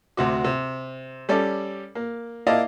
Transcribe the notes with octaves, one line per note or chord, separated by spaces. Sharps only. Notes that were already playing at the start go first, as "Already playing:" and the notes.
D2 C3 F#4
C3
G3 C#4 A4 D5
A#3
A#3 E4 D5 D#5 F5 A5